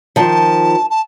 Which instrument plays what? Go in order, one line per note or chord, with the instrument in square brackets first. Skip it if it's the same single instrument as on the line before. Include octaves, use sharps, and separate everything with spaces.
[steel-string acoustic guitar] D#3 F3 [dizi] A5
[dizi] A5